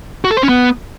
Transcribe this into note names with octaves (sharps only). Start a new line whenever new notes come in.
F#4
A4
C5
C#4
B3